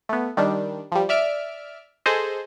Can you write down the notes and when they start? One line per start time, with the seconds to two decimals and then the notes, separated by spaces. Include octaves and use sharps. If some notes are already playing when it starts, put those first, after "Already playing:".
0.09 A3 B3
0.37 D#3 G3 D4
0.92 F3 G3
1.09 D5 E5 F6 D7
2.06 G#4 A4 C5 D#5